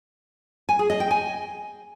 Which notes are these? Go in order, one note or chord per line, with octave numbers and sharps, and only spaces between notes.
G#5
G#4
D#5
G5
G#5